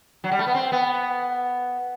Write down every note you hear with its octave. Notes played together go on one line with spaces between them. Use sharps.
F#3
G3
A3
B3
C4
B3